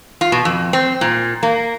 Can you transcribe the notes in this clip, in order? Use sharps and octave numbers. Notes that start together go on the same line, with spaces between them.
F4
B2
F2
C4
A#2
A#3